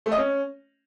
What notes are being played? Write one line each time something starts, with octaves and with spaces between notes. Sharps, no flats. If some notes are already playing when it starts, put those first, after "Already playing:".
A3
D#5
C#4